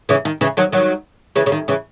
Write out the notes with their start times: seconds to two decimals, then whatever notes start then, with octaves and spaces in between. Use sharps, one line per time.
0.09 C#3 E3
0.25 D#3
0.41 C#3 E3
0.57 D#3 F#3
0.72 D#3 F#3
1.36 C#3 E3
1.46 C#3
1.52 D#3
1.68 C#3 E3